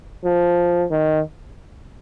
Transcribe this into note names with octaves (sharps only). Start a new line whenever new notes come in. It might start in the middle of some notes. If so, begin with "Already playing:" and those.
F3
D#3